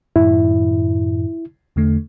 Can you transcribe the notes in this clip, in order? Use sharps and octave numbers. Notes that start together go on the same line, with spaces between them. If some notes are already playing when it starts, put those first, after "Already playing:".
F#2 A2 D#3 E4
E2 D3 A3